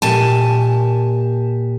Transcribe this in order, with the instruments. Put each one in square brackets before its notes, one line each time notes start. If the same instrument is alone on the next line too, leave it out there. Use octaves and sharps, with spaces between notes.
[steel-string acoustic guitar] A#2 G4 G#5 A5